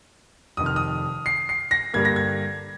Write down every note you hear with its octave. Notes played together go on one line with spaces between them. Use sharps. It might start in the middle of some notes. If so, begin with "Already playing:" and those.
F1 F2 D#3 D#6
F6
D#6
C7
C7
A#6
G2 D3 G3 A#3 G#6
A#6
G#6